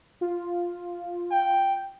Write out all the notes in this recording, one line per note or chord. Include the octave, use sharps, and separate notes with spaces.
F4
G5